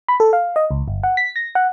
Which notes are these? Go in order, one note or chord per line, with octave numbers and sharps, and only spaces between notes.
B5
A4
F5
D#5
C#2
G1
F#5
B6
A#6
F#5